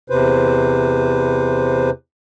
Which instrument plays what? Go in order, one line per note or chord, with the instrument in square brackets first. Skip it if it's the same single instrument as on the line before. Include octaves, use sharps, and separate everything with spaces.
[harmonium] E2 C3 B4 C5